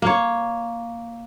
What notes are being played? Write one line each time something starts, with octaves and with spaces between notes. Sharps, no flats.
A#3 C#5